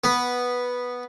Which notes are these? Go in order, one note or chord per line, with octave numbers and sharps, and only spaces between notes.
B3